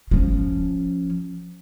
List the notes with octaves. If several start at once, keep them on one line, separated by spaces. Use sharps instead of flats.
F3 C#4